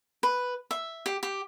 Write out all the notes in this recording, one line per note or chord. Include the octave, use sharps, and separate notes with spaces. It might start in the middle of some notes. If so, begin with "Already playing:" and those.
B4
E5
G4
G4